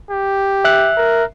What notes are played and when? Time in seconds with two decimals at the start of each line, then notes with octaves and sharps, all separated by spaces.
0.11 G4
0.65 E5 F#6
0.97 A#4